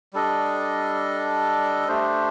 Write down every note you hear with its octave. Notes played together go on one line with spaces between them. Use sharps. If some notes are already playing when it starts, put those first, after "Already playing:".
G3 D4 A4 D#5
A3 D4 G4 C5